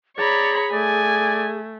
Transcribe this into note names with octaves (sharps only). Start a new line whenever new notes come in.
G#4 C#5 D5 A#5 B5
A3 D5 G#5